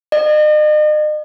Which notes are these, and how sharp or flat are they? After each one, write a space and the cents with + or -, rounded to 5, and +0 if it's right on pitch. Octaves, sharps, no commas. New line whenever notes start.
D#5 -40